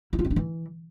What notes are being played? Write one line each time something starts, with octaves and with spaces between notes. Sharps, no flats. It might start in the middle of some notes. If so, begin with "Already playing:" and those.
E4
F4
C4
D4
E3